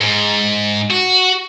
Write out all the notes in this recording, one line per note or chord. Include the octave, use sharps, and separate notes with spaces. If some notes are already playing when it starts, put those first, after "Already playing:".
G#2
F#4